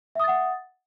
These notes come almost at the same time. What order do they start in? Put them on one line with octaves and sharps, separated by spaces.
E5 D#6 A6 F#5